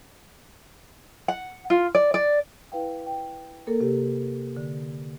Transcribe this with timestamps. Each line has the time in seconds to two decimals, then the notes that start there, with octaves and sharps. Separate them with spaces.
1.28 F#5
1.70 F4
1.95 D5
2.14 D5
2.72 E4 B4 F5 G5
3.06 G5
3.67 A#3 A4 A#4
3.80 C3 G4
4.57 D3